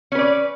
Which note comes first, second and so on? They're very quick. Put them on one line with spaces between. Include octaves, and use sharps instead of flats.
C#4 B4 D5